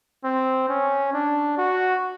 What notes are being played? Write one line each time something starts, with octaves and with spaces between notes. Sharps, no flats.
C4
C#4
D4
F#4